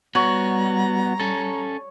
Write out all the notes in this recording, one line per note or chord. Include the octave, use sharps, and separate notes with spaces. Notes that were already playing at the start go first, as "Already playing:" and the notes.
G3 B3 F#4 C#5 A#5
C#4 A4